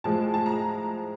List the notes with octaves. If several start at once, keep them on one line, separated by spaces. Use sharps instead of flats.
A2 F3 G#3 A5
A5
A#5